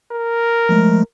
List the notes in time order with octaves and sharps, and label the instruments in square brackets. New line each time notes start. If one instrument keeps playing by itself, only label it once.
[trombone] A#4
[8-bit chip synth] F3 G#3 A3